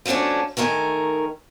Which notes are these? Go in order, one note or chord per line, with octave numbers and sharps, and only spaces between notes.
F3 F#3 A3 C#4 D4
D#3 A3 A#4 F5 G#5